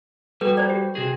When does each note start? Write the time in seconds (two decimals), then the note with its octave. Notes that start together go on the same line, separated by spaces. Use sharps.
0.41 G3 F#4 A4 B4
0.57 C5 D5
0.70 G4
0.95 C3 F#4 G#4